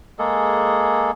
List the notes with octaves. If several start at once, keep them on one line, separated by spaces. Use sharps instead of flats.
G#3 A#3 G#4 A4